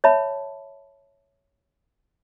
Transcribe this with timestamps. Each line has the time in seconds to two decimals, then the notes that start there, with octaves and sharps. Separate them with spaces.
0.04 C#5 E5 A5 B5